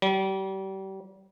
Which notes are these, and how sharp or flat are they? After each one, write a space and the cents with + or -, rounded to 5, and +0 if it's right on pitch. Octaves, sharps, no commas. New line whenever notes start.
G3 -35